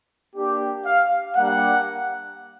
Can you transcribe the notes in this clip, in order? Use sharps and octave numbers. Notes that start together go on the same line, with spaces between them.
A#3 D4 G4
F5
G3 A#3 D4 G4 F#5